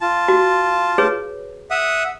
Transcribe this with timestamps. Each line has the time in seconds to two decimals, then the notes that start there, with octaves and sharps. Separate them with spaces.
0.01 F4 A5
0.28 F#4
0.98 G#4 B4 C#5
1.71 E5 F#5 D#6